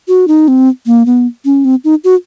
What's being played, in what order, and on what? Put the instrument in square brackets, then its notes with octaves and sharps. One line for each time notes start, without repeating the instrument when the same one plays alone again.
[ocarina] F#4
D#4
C4
A#3
B3
C#4
C4
D#4
F#4